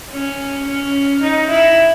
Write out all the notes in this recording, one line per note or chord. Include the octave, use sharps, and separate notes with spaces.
C#4
C#4
D#4
E4